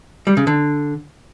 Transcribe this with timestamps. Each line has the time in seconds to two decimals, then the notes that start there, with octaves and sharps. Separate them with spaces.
0.27 G3
0.37 C#3
0.47 D3